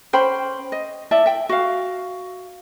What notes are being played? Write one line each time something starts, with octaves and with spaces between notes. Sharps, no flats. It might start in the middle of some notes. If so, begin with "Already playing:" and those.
C#4 C5 G5 B5
D#5
E4 D5 E5 A5
E5 G5
F#4 F5